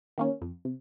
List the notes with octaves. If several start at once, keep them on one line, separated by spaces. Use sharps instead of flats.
D#3 A#3 C#4
F2
C3